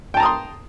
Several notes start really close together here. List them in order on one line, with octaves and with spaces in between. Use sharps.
G5 A5 A#5 D#6 C6